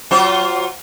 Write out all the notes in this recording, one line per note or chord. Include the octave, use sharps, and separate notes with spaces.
F#3 F4 C5